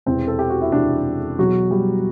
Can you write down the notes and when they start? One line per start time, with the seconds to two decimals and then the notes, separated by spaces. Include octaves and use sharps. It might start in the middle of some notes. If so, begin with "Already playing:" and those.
0.06 E1 E2 C3 E3 C4
0.28 A4
0.39 G4
0.50 F#4
0.61 E4
0.72 E1 E2 C3 E3 D4
1.39 E1 E2 B2 F#3 F#4
1.71 G3 G4